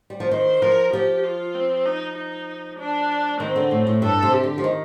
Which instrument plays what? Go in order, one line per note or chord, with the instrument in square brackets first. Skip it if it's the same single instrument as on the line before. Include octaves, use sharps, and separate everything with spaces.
[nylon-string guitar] G3
F3
[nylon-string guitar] D#3 [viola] C5
[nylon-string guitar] F3 [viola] A#4
[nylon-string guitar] F3 [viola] G4
[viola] F4
C4
D#4
D#4
D4
[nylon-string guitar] D#3 [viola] C4
[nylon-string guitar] D3
A2
A2
[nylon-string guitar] G2 [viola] A4
[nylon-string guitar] C3
[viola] G4
[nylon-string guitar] D3
F3
D#3